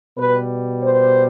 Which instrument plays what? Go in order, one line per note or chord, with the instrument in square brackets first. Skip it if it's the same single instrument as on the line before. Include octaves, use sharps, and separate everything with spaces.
[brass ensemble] B2 G3 B4
C5